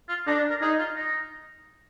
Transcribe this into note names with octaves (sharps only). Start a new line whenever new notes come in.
F4
D4 D#4
D4
A#4
D#4 G#4
F4
D#4